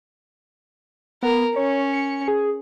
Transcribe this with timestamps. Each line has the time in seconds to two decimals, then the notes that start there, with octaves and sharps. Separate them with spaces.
1.22 B3 A#4
1.56 C#4 C#5
1.93 C#7
2.28 G#4